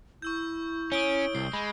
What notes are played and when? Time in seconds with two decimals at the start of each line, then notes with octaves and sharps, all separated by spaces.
0.22 E4 C#6 E6 G6
0.92 C#4 C#5 D#6 D7 G7
1.35 C2 C7
1.53 G#3 B5